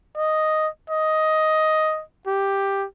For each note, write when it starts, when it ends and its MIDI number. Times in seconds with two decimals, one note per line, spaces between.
0.18 0.68 75
0.90 2.03 75
2.27 2.86 67